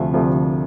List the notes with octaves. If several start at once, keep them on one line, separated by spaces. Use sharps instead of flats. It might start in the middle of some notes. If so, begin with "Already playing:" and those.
Already playing: D2 C3 F3 A3
D2 C3 F3 A3